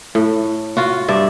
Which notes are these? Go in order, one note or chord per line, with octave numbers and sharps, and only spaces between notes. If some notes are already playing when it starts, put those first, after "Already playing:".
A2
F4 F#4
G2 D5 E5